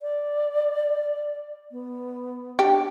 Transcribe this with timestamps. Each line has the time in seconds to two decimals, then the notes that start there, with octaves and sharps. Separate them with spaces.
0.01 D5
1.72 B3
2.59 D4 G4